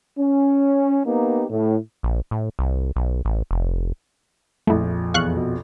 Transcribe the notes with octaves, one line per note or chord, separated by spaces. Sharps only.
C#4
A#3 B3 D#4 G4
A2
A#1
A2
C2
B1
A1
F1
A#1 F2 A3 E4
E2 F5 C#6 F#6
B2